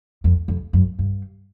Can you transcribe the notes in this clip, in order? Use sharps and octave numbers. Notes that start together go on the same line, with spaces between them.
F2
F2
F#2
G2